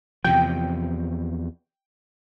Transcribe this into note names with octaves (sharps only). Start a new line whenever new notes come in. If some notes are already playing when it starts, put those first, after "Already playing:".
E2 C3 F3 G5